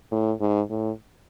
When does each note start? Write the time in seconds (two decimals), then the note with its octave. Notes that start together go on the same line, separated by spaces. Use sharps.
0.11 A2
0.41 G#2
0.70 A2